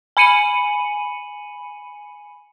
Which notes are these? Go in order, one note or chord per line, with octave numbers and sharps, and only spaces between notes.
G#5 B5 C#7 D#7 F#7